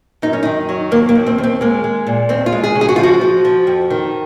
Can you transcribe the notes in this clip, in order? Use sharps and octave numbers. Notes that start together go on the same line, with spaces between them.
F#2 D#4
C#4
D#3 D#4
F#3
D#2 A#3
A#3
D#2
C4
D#2
C4
G#3 A#3
G#3
A#2
D#2 C4
F4
G#3
G#4
C#3
G#4
F#4
F4
F3 F#4
F3
F3
F2
D#3